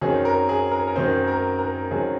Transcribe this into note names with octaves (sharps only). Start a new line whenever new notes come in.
F#2 D#3 F#3 C4 G#4
A#4
G#4
A#4
A#4
F#2 D#3 F#3 C4 C5
A#4
A#4
F#2 D#3 F#3 C4 G#4